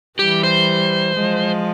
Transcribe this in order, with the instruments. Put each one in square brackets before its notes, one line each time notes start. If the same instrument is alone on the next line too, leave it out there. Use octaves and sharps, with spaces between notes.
[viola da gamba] E3 G3 [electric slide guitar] G4
[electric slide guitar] C5
[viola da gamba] F3 G#3